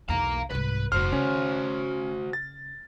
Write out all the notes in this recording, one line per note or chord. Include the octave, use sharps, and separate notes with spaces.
B1 E2 F5 A#5
C2 G#2 B4
F1 G2 F#4 C5 F6
C#3 C#4
A6